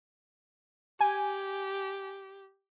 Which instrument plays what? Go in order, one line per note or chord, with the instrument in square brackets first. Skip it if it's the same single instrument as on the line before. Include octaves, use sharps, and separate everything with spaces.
[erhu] G4 [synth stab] G#5